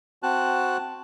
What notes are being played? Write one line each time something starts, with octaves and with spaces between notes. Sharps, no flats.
C4 F#4 A5 F#6